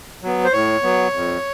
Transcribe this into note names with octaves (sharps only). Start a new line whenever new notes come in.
F#3 B3
C5
A2 C#5
F#3 B3
F2